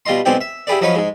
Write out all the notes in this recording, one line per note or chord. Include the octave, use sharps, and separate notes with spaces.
B2 G3 F4 D#5 C6
B1 G#3 B3 C4 D5 G5
E5
E4 G4 G#4 B4 D5
F3 F#3 C#4 D#4 B4 C#5
G#2 G#3